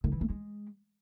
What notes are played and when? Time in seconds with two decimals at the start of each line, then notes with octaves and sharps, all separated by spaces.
0.04 D#3
0.12 E3
0.21 A3
0.30 G#3